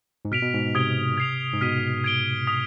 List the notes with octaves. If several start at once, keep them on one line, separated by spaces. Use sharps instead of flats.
G#2
B2 F6 B6 D7 F7
B2
G#2
C3 D#6 G#6 B6 D7 G7
G#6 C7 F7
G#2
B2 F6 B6 D#7
G#6 D7 G7
D#6 B6 F7